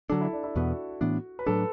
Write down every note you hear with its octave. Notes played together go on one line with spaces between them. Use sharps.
D3 F#3 D4 A4
E4
D4
E4
E2 B2 B3 F#4
A2 E3 B3 D4
B4
A2 F#3 D4 A4